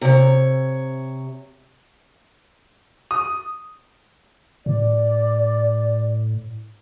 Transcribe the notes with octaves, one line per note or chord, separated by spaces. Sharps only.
C3 C#5
D#6
A2 D5